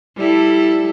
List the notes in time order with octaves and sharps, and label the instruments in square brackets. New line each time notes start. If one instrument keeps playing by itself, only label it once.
[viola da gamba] G3 E4 A4